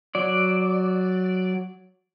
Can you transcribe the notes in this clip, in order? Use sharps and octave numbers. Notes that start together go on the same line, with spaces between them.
F#3 D5